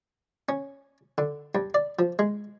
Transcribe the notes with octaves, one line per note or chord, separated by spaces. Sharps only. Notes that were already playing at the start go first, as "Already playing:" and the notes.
C#4
D3
G2
D5
F3
G#3